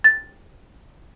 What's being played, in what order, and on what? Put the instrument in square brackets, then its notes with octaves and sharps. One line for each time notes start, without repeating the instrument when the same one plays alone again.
[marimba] A6